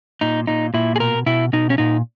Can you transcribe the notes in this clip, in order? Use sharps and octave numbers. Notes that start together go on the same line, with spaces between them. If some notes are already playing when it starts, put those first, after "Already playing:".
A#2 D#4
A#2 D#4
A#2 E4
G#4
B2 A#4
B2 E4
B2 D#4
C#4
A#2 D#4